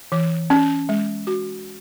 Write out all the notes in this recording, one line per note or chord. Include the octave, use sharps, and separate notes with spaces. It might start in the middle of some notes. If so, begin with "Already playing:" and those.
E3
C#4
G#3
F#4